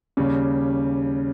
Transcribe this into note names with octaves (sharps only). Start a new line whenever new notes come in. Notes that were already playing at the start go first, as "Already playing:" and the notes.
D#2 C#3 G3 C#4